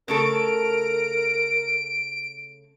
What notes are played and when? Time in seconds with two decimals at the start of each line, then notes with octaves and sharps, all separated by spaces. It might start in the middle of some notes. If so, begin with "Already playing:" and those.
0.08 C#3 A3 A4 A#4 D7